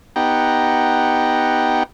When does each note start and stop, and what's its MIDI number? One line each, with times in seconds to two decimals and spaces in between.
0.16 1.83 59
0.16 1.83 63
0.16 1.83 67
0.16 1.83 78
0.16 1.83 79
0.16 1.83 82